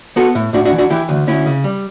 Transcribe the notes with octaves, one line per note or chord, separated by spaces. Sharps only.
B3 F#4 A4
A2
A2 D4 F#4
D4 F#4
E3
D4 F#4
E3 E4 G4
D2
D2 C#4 E4
C#3
G3